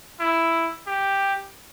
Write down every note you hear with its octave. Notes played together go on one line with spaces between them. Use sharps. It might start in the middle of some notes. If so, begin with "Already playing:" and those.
E4
G4